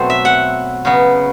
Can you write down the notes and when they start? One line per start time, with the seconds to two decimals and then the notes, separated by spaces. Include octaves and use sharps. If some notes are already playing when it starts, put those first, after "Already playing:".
Already playing: B2 F#3 A3 C4 C5
0.10 E5
0.25 F#5
0.85 C#3 F#3 B3